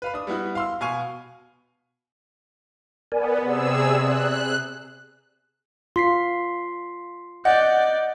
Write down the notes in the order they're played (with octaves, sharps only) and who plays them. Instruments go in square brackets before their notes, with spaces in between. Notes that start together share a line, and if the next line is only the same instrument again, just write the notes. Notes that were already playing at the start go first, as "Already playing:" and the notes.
[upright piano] B4 F5 B5
D4 D#6
G3 B3 E4 F#4
F5 C6 E6
B2 F5 G#5 C#6
[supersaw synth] B3 [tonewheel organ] A#4 D5 G#5
[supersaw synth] C3 G#4 E6 [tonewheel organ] D5
[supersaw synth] F#6
[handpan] F4 [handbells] C6 B6 C7
[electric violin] D5 G6 [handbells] D#5 [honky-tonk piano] F#5